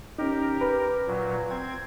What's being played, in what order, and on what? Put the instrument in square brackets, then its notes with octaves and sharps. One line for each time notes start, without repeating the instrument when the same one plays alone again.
[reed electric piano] C#4 D#4 [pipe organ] G4 A#4
[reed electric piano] B4
[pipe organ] A#2 F#3
C4 G#6